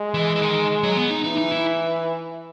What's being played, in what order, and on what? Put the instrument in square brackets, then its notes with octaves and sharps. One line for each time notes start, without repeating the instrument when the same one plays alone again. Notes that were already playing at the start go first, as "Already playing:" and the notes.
Already playing: [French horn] G#3
[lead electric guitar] E3
E3
D#3
F#3
B3
D#4
[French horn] E3 [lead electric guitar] D#4
[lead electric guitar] D#4
E4